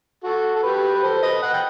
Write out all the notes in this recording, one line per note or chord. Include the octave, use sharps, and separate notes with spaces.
F#4 A4
A4
G4 B4
B4
A4 C5
B4 D#5
D#5 F#5
G5